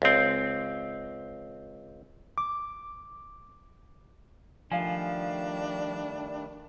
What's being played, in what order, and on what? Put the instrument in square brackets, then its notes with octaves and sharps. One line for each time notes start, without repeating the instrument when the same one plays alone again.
[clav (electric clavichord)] C#2 C4
[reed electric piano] D6
[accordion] D#3 G3 A3 [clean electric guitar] F3 [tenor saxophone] D4 [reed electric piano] F5 G#5